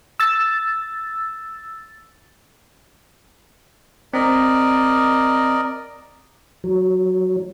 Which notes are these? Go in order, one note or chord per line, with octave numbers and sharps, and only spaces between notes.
E6 A6
C4 A#4 D5 D#5
F#3